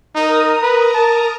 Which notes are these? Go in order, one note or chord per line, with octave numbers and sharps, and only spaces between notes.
D#4 A#4 A#5 D#6
B4
A5